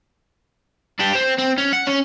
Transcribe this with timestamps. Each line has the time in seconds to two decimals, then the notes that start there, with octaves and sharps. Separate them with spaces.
1.00 D4 G4
1.15 C4
1.38 C4
1.58 C#4
1.73 F#5
1.87 C#4